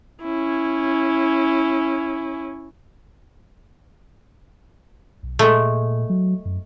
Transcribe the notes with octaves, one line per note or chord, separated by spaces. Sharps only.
C#4 E4
B1
A#2 G#3 A3
F#3
F#2